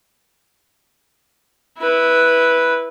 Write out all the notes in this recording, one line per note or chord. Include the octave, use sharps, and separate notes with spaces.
E4 B4